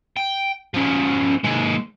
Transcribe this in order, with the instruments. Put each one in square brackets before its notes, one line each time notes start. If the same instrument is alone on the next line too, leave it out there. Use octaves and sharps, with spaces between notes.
[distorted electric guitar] G5
F3 C#4
D#2 G#3